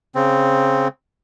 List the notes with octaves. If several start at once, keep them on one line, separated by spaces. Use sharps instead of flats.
C#3 C4